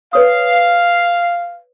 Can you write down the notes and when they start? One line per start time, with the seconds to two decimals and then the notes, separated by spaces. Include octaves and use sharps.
0.13 B4 C#5 F5 D#6